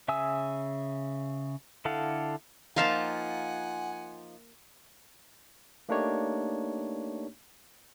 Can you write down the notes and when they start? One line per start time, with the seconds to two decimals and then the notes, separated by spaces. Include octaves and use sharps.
0.08 C#3 E5 G#5 D#6 E6
1.85 D3 E4 A4 F5 F#5
2.76 F3 A#3 D#4 F4 F5 F#5 G#5 A5
5.89 A3 A#3 D4 D#4 G4 C#5